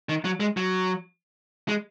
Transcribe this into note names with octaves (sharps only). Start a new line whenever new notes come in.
D#3
F#3
G#3
F#3
G#3